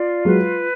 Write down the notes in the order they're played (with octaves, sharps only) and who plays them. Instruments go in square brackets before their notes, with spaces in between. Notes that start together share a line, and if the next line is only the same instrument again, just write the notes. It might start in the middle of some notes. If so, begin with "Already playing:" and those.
Already playing: [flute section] F4 D5
[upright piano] F#3 G#3 [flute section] B4